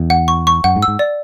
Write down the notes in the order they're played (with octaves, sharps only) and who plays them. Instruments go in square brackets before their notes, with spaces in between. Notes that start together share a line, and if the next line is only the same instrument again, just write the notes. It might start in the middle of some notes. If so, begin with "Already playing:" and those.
Already playing: [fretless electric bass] E2
[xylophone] F#5
C#6
C#6
[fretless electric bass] F#2 [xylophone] F#5
[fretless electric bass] G#2
[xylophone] E6
[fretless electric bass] G#2
[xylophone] D5